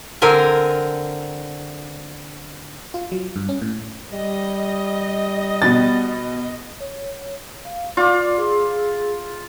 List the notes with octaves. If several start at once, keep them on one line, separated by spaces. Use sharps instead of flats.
D3 C4 A#4 G#5
F4
F#3
G2
C#4
A2
G3 D#5
B2 A6
C#5
F5
F4 D5 D6
G#4 E6